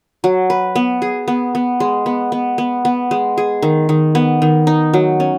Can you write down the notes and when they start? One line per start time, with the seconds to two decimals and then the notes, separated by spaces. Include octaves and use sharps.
0.24 F#3
0.50 B4
0.75 B3
1.02 G#4
1.28 B3
1.55 B3
1.80 G#3
2.06 B3
2.32 B3
2.58 B3
2.85 B3
3.11 G#3
3.38 G#4
3.62 D#3
3.89 D#3
4.15 B3
4.42 D#3
4.67 D#4
4.94 F#3
5.20 C#4